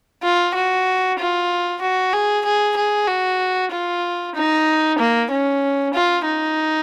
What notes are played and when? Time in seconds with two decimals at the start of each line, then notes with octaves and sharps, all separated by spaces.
0.23 F4
0.55 F#4
1.19 F4
1.82 F#4
2.14 G#4
2.45 G#4
2.77 G#4
3.08 F#4
3.72 F4
4.35 D#4
4.99 A#3
5.31 C#4
5.94 F4
6.25 D#4